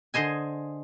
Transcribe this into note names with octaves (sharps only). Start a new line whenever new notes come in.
D3 G#4 C5 D#5 G#5